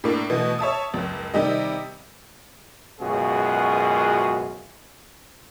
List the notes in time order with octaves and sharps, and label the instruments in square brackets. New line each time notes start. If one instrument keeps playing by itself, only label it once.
[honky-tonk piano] A2 A#3 D4
B2 E3 A3 B3
C#5 E5 A5 D#6
F#1 C#2
C3 D#3 G3 G4 D#5
[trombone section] C#2 F#2 B2 F4 F#4 G#4